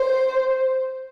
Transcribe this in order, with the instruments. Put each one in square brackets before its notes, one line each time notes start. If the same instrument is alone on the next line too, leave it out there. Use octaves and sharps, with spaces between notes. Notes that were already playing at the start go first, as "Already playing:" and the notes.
Already playing: [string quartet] C5